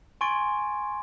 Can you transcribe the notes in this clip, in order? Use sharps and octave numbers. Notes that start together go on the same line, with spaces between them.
G#5 C6 C#6 G#6 A6 D7